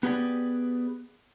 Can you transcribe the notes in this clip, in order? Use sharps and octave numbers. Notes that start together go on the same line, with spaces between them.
B3 G4 G#4 B4 D5